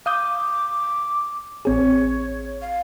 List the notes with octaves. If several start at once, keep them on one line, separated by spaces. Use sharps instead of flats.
F5 D6 D#6 G6
A1 C4 G#4 C#5
F5